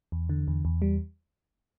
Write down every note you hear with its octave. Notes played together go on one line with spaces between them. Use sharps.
E2
D3
E2
E2
G3